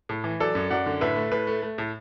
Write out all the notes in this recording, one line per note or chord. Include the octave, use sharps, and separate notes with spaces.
A2
E3
F#3 A4 D5
F#2
F#2 D5 F#5
D3
A2 B4 E5
A3
A2 B4
A3
A3
A2